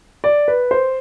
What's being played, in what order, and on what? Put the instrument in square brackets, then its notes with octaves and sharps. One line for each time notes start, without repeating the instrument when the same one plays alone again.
[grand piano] D5
B4
C5